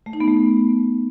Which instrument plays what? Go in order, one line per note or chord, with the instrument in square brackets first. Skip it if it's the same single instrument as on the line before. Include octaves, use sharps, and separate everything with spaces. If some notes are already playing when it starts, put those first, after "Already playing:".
[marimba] A3
D#4
B3
A3